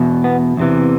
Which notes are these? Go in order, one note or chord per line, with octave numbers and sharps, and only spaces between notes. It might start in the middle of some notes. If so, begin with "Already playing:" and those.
Already playing: E2 B2
B3
E2 C3 E3